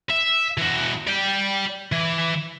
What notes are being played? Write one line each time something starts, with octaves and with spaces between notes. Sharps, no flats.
E5
E3 F#4
D5 G5
E3